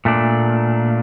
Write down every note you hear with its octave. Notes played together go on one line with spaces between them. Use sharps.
A#2 A3 D4